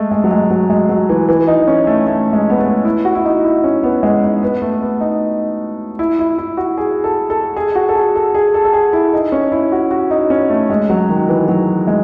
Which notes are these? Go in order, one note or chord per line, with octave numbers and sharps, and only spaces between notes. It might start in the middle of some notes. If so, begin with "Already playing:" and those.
Already playing: G#3 A3
G#3
F#3
G#3
F#3
G#3
F#3
E3
E3
D#4
C#4
A3
A3
G#3
B3
A3
E4
F#4
E4
D#4
E4
C#4
B3
G#3
D#4
B3
A3
B3
D#4
E4
E4
E4
F#4
G#4
A4
A4
G#4
F#4
A4
G#4
A4
G#4
A4
A4
G#4
E4
D#4
C#4
E4
F#4
F#4
D#4
C#4
A3
G#3
F#3
D#3
E3
F#3
G#3